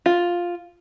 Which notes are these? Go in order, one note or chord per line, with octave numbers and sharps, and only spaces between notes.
F4